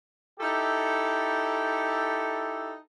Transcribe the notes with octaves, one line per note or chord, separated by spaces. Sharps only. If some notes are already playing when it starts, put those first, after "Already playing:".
D#4 E4 G4 A4